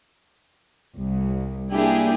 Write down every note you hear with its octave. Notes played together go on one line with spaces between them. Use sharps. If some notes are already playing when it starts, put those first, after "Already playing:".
C2
A#3 D4 E4 G4 G#4